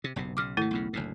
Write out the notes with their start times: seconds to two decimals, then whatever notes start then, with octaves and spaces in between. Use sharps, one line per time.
0.04 C3
0.16 F#1 B1 C3
0.37 B1 C#3 D6 F6
0.57 G#1 C3 A3 E4 A4
0.71 B1 E2 C#3
0.93 F#1 D2 A2